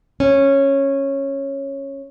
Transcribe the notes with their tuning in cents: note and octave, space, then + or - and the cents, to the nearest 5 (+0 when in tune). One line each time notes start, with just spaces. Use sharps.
C#4 -10